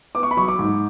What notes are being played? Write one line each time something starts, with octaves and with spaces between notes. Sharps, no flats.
B3 D6
C#6
B5
F#3 C#6
D6
G#2